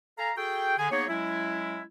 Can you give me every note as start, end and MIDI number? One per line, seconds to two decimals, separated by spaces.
0.19 0.31 69
0.19 0.31 77
0.19 0.31 80
0.19 0.31 82
0.37 0.77 66
0.37 0.77 68
0.37 0.77 69
0.37 0.77 79
0.78 0.91 50
0.78 0.91 68
0.78 0.91 80
0.91 1.07 58
0.91 1.07 59
0.91 1.07 63
0.91 1.07 68
0.91 1.07 73
1.08 1.82 54
1.08 1.82 56
1.08 1.82 61
1.08 1.82 64